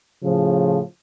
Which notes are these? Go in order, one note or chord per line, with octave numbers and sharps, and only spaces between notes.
A2 C#3 F3